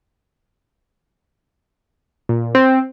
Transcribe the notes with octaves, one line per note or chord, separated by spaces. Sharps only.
A#2
C4